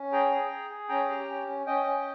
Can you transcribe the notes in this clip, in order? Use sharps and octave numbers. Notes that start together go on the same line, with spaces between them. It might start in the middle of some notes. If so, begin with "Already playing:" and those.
Already playing: C#4
G#4 G5 A#5
G#4
G#4
G#4
C#4 G5 A#5
G4
C#4
C#4
C#4 D#5 G5
C#4